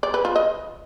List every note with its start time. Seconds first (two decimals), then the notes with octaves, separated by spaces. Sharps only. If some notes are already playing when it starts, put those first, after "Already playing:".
0.03 D5
0.14 B4
0.25 F4
0.36 D#5